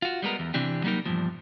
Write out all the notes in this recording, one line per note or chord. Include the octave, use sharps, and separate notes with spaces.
F4 F#4
G3 G#3 B3 A#4
E2
C3 E3 C4 D4 G4
F#3 G3 A#3 D#4 A#4
E2 G2 A#2 F3